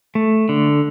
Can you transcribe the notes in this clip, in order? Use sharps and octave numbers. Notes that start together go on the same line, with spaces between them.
A3
D3